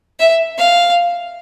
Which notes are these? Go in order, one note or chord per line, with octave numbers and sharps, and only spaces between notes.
E5
F5